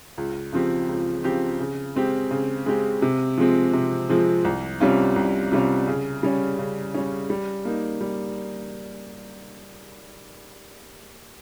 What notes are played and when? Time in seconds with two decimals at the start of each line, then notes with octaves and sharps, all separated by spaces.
0.18 C#2
0.53 C#3 F3 C4 G4
0.89 C#2
1.24 C#3 F3 C4 G4
1.60 C#3
1.95 G#3 C4 G4
2.31 C#3
2.66 G#3 C4 G4
3.02 C3
3.38 F3 G#3 C4
3.73 C3
4.09 F3 G#3 C4
4.45 C2
4.80 C3 G3 C#4 F4
5.16 C2
5.52 C3 G3 C#4 F4
5.88 C#3
6.23 G3 C#4
6.59 C#3
6.94 G3 C#4
7.30 G3
7.65 A#3 D#4
8.01 G3